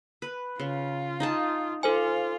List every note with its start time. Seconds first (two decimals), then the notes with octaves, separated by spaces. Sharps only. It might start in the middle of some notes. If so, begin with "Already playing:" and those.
0.22 B4
0.59 C#3 F4
1.20 D#4 G#4 A5
1.83 F4 A4 C5 G#5